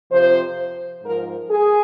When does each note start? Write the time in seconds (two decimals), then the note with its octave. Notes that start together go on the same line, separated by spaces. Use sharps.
0.11 F2 C3 F3 C5
1.04 G#2 F3 A#4
1.50 G#4